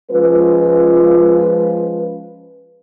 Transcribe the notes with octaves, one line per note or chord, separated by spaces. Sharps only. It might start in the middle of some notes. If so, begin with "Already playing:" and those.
F3 G#3 C#4 F4 B4